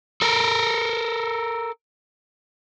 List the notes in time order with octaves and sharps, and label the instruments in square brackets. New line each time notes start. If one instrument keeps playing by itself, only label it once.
[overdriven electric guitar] A4 A#4